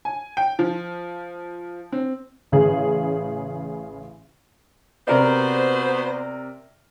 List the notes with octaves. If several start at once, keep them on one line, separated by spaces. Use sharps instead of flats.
G#5
G5
F3
C4
A1 C#3 G#4
C3 B3 F#4 A#4 C5 D5